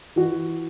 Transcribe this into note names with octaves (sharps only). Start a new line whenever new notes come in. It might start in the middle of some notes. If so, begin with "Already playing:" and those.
E3 F#4